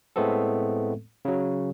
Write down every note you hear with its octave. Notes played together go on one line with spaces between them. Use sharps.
A2 G#3 A3 B3 C4 A4
C#3 F#3